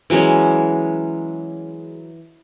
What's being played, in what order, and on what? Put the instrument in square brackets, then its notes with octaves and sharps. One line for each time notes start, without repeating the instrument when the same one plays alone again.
[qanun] E3 F#3 G#3 C#4